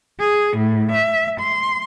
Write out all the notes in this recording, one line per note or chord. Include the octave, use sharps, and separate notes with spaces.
G#4
A2
E5
C6